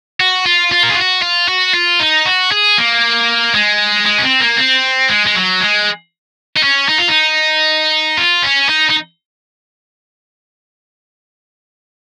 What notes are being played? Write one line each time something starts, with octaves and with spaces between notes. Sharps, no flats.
F#4
F4
F4
A#4
G#4
F#4
F4
F#4
F4
D#4
F#4
G#4
A#3
G#3
G#3
C#4
C4
A#3
C4
G#3
G#3
F#3
G#3
D#4
C#4
D#4
F4
D#4
F4
C#4
D#4
D#4